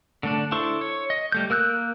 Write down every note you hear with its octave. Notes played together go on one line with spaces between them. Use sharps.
D3 A3 D4
D4 E4 A4 C5 C#6
C#5
D#5
G3 A3 G6
A#3 A#4 E6 F#6 G6